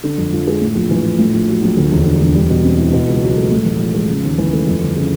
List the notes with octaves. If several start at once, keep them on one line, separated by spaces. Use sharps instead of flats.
D3
F2
F3
G#3
A2
A#1
E3
A#1
A2
A#1
F#3
A#1
D2
E1
D3
E1
G3
B2
C4
E4
B2
C#2
F#3
A3
A2
A1
F3
G#3
C#3
D#2
E3
A3
F2
G1
C#3